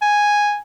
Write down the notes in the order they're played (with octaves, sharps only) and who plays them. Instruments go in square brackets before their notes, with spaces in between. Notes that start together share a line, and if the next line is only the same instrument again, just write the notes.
[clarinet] G#5